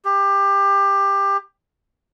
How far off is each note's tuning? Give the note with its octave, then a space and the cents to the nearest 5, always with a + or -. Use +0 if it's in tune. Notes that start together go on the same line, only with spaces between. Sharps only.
G4 +20